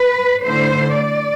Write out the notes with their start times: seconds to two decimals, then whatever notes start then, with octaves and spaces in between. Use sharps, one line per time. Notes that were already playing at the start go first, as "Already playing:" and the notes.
Already playing: B4
0.44 D3 A3 E4 C5
0.95 D5